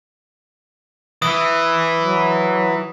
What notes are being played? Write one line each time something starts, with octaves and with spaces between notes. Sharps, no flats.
E3 D#6
F#3